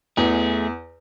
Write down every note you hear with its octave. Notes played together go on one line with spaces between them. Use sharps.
E2 A3 G#4